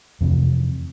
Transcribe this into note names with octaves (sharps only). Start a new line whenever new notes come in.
F2 C3 E3